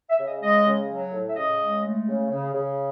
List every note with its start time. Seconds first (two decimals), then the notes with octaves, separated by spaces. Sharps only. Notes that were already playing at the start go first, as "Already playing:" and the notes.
0.10 E5
0.18 C#3
0.25 D#5
0.41 G#3 D#5
0.65 C#3
0.89 F#3
1.12 A2
1.28 E5
1.36 C#3 D#5
1.59 G#3
1.83 A3
2.07 C#3
2.30 C#3
2.53 C#3